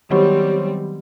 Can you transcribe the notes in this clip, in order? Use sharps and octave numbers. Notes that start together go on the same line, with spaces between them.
D#3 F#3 G3 B3 C4 G4 C#5 C#6